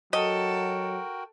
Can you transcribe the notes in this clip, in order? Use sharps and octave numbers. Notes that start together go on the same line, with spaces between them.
F#3 F#4 A4 A#4 D#5 G5